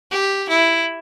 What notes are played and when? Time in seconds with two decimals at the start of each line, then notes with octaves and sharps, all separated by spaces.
0.11 G4
0.49 E4